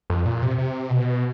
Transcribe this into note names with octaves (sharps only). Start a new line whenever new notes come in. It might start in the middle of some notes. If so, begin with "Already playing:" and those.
F2
A#2
C3
C3
B2